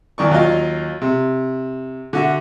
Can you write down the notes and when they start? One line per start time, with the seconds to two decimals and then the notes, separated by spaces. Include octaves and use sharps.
0.18 E2 D#3 D5 C#6
0.31 D#2 F#3 F4 D#5 F5
1.02 C3
2.13 D3 F#4 E5